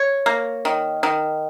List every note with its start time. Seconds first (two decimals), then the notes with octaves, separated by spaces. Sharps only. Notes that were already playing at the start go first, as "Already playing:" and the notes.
Already playing: C#5
0.26 A#3
0.65 D#3
1.03 D#3